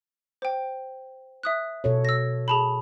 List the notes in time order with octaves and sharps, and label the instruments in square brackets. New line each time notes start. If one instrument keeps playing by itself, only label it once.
[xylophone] C5 G5
E5 D#6 F#6
[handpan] B2 A4 C#5
[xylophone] E6 A#6
G#4 A5 B5